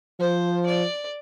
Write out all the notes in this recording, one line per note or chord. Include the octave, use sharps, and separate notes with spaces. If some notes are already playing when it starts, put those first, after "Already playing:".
F3 C5
D5